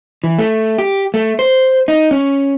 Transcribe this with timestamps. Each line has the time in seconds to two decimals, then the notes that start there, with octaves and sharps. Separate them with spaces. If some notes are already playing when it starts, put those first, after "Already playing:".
0.24 E3
0.39 A3
0.78 G4
1.14 A3
1.39 C5
1.88 D#4
2.11 C#4